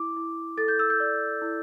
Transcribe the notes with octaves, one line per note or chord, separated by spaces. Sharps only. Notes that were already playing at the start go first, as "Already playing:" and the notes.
Already playing: E4 D6
E4
A4 A6
G6
E6
G6
D5
E4